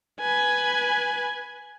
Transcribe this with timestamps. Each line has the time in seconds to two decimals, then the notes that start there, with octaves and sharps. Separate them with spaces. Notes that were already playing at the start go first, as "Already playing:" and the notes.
0.21 B4 G#5